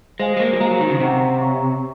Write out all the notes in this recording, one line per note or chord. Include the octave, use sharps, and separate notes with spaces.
G#3 C5 F5 G#5
G#3
A#3
F#3
G#3 C5 F5 A#5
F#3
D#3
C#3
C3 C5 F#5 A#5 C#6
C#5 F5 A#5 C#6